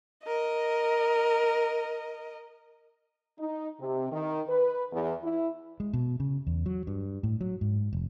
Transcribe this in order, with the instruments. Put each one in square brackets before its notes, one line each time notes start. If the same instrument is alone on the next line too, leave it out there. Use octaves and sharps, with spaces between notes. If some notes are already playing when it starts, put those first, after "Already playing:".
[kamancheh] A#4 D#5
[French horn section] D#4
C3
D#3
B4
E2
E4
[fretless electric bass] G#3
B2
C#3
E2
F#3
G2
A2
F#3
G#2
F1